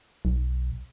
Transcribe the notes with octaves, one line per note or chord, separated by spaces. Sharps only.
B1